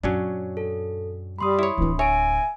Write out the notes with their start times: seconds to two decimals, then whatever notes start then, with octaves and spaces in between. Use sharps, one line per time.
0.04 F#2 A#2 F#3 C#4 D4
0.57 A4
1.39 G3 B5 C6 D#6
1.59 E4 C#5
1.78 D1 E3 D4
1.99 C#5 E5 G#5 D7